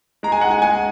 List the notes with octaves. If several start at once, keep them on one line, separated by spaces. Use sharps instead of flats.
G#3 A#5
G#5
G#3 F#5
G#5
G#3 G#5